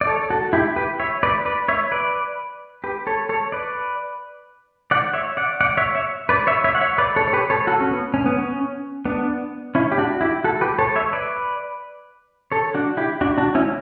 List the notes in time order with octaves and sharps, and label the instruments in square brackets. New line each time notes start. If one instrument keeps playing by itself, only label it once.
[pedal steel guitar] D5
A4 C#5
F#4 A4
E4 G4
G4 B4
C#5 E5
B4 D5
B4 D5
C#5 E5
B4 D5
G4 B4
A4 C#5
A4 C#5
B4 D5
D5 F#5
C#5 E5
D5 F#5
D5 F#5
C#5 E5
C#5 E5
B4 D5
C#5 E5
C#5 E5
F#5
C#5 E5
B4 D5
A4 C#5
C#5
G4 B4
A4 C#5
F#4 A4
C#4
B3
C#4
B3
C#4
B3 D4
C#4 E4
G4
D4 F#4
E4 G4
F#4 A4
G4 B4
A4 C#5
C#5 E5
B4 D5
A4 C#5
D4 F#4
E4 G4
D4 F#4
D4 F#4
C#4 E4